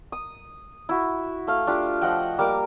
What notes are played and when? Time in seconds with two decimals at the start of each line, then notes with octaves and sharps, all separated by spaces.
0.12 D#6
0.89 E4 F#4
1.47 A3 F5
1.67 D4 F4 G4
2.01 F3 D#5 F#5 G5
2.39 G3 A#3 A#4 D6